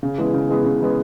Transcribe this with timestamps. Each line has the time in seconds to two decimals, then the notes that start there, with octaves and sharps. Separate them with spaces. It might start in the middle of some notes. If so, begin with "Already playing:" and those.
0.03 C#3
0.18 E3 G#3 B3
0.34 C#3
0.49 E3 G#3 B3
0.64 C#3
0.80 E3 G#3 B3